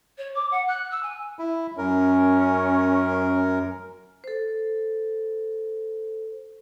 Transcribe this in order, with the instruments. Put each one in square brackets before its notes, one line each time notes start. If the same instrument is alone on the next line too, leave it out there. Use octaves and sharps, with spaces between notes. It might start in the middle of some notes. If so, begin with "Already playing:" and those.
[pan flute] C#5
D6
F#5
F#6
E6
G#5
[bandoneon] E4
[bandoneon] F#2 A#4 [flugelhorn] C#4
[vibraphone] A4 C5